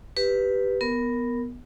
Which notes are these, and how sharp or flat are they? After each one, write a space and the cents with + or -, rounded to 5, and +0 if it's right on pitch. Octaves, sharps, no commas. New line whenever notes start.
G4 +0 B4 +0
B3 +0 A#4 -5